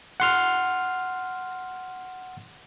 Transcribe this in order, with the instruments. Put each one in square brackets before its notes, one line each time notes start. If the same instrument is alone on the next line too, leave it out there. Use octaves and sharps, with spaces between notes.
[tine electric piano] F#5 C6 F6